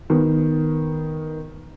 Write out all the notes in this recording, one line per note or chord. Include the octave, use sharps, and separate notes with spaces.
D#3 B3